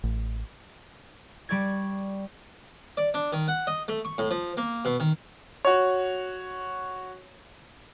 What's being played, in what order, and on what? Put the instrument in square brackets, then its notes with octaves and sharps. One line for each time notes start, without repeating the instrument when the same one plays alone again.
[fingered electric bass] A1
[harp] G3 D5 C#6 G#6
[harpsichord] D5
D4
D#3
F#5
D#5
A3
C#6
A2
F3
A#3
B2
D#3
[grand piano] F#4 C#5